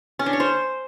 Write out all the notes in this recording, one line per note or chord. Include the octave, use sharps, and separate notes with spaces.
C#4
D4
C#5
C5